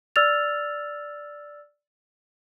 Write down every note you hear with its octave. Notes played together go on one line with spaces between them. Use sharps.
D5 E6 F6 A6 F7